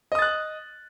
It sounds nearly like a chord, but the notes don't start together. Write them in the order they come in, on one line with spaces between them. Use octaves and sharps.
D#5 D#6 A6 F#6